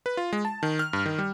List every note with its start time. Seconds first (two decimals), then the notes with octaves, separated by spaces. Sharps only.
0.06 B4
0.17 F4
0.33 G#3
0.45 A5
0.63 D#3
0.79 F6
0.93 G2
1.06 D#3
1.19 G3